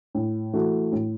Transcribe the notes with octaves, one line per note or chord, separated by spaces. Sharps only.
A2
E3 A3 F#4 A4
A2